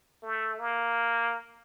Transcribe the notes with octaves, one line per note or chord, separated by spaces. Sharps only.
A3
A#3